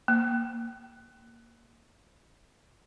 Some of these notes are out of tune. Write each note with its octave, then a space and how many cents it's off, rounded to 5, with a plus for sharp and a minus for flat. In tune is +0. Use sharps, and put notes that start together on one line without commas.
A#3 -5